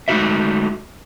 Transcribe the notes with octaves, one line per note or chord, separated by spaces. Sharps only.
G#3 A3 D#4 F#4 A#4 E5